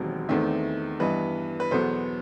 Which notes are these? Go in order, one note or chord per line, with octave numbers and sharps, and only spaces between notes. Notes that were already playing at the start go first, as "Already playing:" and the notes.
Already playing: E1 D#2 D#3 F#3 C4
E2 D#3 A3 C4
G2 E3 B3 B4 D#5
B4
E2 B2 F#3 B3 A4 C5